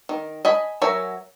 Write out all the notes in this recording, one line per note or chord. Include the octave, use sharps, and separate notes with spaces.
D#3
D#5 G#5 B5
F#3 A#4 C#5 E5 G#5